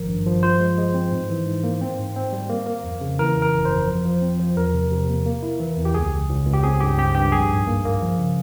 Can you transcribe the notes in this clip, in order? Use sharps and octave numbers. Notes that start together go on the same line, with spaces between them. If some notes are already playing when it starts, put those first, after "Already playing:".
Already playing: G#1 F3 A#4
G2
F3
F4 C5
G#3
G#3
C4
G#2
E3
G#2
A#3
C4
G#2
C4
G3
A#3
A#3
F2
C#3
E3 A#4
F2
A#4
G1
C5
F2
F3
F3
C4
F3
E2 A#4
C3
C3
A#3
A#3
E4
E3
E2
G4
C#2 G#4
C#2
C#2
C#2
G4
C4 G#4
G2 G4
C4 G4
G2 G4
A#1 G#4
G#2
A#3
A#3
F3
C#3